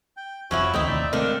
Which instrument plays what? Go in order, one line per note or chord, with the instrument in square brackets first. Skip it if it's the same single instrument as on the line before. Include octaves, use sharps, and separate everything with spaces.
[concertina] G5
[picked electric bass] F1 F2 [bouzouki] F3 F#3 E4 [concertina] F#4 C#5 G#5
[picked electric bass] D2 D#3 A3 [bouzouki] C4 D#4 E4 [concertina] D#5 G5
[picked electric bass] D#2 A2 C3 [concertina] D5 E5
[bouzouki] D#3 D4 [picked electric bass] G#3 A3 C4 [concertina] A4 F5